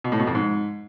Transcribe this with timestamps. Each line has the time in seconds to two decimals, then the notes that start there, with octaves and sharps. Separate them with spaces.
0.04 B2
0.12 A2
0.20 B2
0.27 F2
0.35 G#2